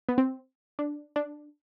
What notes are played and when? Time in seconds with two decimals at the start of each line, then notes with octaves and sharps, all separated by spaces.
0.09 B3
0.18 C4
0.79 D4
1.16 D4